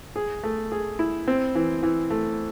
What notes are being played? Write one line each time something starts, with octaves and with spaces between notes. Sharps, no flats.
G#4
A3
G#4
E4
C4
E3
E3
A3